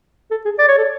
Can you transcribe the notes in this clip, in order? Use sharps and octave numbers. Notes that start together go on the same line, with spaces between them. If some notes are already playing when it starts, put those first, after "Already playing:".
A4
G#4
D5
C#5
A4